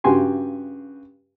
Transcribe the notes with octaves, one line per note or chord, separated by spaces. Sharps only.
G2 C#3 F#4 G4 G#5 C6